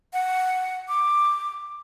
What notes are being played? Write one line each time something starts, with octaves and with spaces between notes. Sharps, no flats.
F#5
D6